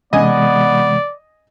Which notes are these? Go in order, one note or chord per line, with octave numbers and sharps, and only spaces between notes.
C3 E3 G#3 B3 D5 D#5 G#5